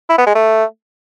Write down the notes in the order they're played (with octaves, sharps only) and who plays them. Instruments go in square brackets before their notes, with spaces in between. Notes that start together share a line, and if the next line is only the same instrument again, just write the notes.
[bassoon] E4
B3
G#3
A3